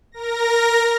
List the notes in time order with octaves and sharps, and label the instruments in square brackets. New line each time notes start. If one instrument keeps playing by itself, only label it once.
[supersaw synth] A#4 A#6